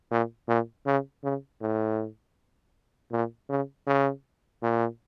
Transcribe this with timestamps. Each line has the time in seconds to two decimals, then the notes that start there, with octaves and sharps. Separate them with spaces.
0.11 A#2
0.48 A#2
0.86 C#3
1.23 C#3
1.61 A2
3.12 A#2
3.49 C#3
3.87 C#3
4.63 A#2